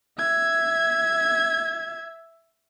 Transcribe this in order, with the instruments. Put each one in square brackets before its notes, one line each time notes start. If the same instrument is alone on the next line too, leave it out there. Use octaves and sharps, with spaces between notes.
[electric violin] E5 G#6